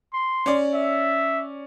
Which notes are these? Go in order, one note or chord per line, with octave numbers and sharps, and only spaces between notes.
C6
C#4 D5
E5